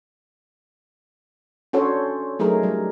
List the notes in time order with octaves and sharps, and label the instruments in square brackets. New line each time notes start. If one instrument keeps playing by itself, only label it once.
[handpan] C#4 D4 F#4 A4 C5 C#5
F#3 A3 D#4 G#4 A#4
G3